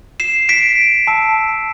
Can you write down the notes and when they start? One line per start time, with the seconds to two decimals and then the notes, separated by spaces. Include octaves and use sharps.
0.20 C7 E7
0.49 B6 D7
1.07 A5 E6